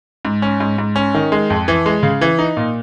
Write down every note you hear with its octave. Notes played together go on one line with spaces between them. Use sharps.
G#2
C#4
G#2
G#2
C#4
D#3
G#3
F2
E3
G#3
C#3
E3
D#4
A#2